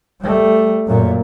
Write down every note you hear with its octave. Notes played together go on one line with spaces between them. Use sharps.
G3 A3
F#2 A#2